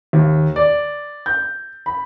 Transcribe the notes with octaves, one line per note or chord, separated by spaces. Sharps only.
D#2
D5
G6
B5